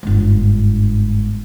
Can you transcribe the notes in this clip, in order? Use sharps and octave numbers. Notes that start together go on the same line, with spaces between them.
G1 G#2